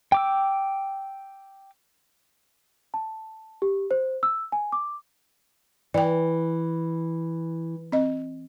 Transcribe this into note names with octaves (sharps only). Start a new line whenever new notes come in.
G5 D6 E6
A5
G4
C5
E6
G#5
D6
E3 D5 G5
C4 D#5